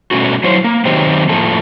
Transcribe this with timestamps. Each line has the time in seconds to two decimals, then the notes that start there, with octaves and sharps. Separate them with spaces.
0.11 B2 G3 A3 C#4 F#4
0.44 F#3 E4 C5 C#5
0.64 A#3
0.85 D#3 F#3 C4 D#4 G4 C5
1.29 A2 F3 A3 A#3 A4